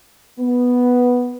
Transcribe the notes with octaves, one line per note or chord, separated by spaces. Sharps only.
B3